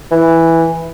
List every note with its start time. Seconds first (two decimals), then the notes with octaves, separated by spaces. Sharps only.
0.11 E3